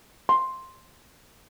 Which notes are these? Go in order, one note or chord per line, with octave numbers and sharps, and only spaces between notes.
C6